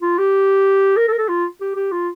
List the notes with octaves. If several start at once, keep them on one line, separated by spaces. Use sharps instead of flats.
F4
G4
A#4
A4
A#4
A4
F4
G4
G4
F4